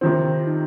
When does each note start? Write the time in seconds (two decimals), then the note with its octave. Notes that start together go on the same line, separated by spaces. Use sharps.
0.01 C3 D#3 C4 F4
0.29 F4
0.47 D#4